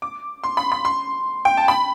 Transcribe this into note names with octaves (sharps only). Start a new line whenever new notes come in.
D6
C6
B5
B5
C6
G5
A5
B5